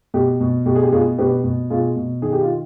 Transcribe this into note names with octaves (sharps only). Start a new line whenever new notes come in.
B2 G4
B2
B2 G4
G#4
G4
B2 F4 G#4
B2 G4 B4
B2
B2 F4 G#4
B2
D#3 G#4
G4
F4